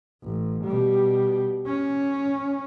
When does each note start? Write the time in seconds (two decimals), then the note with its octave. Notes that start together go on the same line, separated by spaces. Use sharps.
0.24 A1
0.65 B2 G3
1.67 C#4